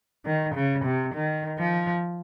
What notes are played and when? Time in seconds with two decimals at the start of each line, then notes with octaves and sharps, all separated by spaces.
0.26 D#3
0.55 C#3
0.85 C3
1.14 D#3
1.59 F3